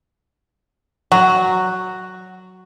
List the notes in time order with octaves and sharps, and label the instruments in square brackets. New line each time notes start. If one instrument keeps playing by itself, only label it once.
[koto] F#3 [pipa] F#4